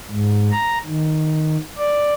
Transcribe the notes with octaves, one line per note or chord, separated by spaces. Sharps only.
G#2
A#5
D#3
D5